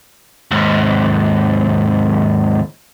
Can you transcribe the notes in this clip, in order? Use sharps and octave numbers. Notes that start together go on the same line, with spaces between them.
D#2 G#2